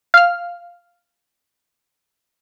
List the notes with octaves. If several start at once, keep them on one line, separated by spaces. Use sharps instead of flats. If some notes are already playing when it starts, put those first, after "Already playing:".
F5 F6